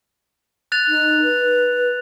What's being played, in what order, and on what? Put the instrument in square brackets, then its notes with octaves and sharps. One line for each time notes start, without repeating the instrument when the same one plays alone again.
[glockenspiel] F#6 A6 F7
[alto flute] D#4
B4